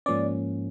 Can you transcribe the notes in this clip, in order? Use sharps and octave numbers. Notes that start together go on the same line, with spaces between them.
G#2 F3 A#3 C#4 D5